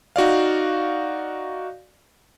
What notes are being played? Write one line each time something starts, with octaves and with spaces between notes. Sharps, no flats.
D#4 F#4 D5 F5